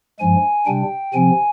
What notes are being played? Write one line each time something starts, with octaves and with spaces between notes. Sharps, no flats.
G2 F3 G#3 G#5
C3 G3 D4 G5
C3 F3 C4 G#5